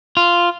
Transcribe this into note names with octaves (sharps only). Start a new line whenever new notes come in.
F4